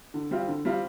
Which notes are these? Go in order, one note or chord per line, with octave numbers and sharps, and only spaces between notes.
D3
G3 C4 F4
D3
G3 C4 F4